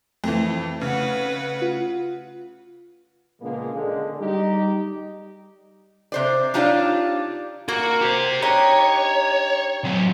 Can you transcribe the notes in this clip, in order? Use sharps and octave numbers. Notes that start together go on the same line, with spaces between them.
F2 E3 A3
C#3 B4 F#5
F4
A#2 C#3 F3 G#3 A#3 B3
D3 G#3
G3 D#4 G4
C3 C5 D5
D4 D#4 F4 G4 C#5 D5
A#3 F#4
G4 C5
D4 D#4 G4 C#5
F#3 C4